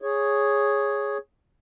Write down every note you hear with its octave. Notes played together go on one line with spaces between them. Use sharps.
G#4 C#5